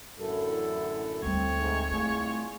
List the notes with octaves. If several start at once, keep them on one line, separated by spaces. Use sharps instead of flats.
A1 F#2 D3 E4 A4
D2 G3 A3 C4 C#5
G#2
C2 A3 F4 G#4